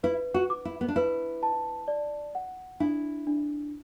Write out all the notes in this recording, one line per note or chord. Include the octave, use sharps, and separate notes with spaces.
E4 B4
F#4
D6
E4
B3
D4
E4 B4
A5
D5
F#5
D4 E4
D4